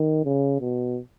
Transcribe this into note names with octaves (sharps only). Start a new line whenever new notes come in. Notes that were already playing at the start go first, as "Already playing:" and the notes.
Already playing: D#3
C#3
B2